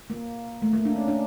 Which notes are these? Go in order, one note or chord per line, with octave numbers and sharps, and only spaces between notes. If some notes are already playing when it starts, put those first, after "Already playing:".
A#3
A3
A#3
D4
C#4
D4